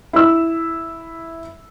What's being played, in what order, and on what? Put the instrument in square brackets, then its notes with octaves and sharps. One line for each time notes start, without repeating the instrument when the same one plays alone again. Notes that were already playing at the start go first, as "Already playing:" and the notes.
[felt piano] E4 E6